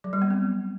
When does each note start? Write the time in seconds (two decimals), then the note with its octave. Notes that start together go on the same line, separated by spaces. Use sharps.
0.04 F#3
0.13 G3
0.22 B3
0.30 C4